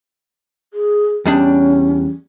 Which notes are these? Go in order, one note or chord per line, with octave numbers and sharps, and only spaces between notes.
G#4
E2 G3 C#4 D4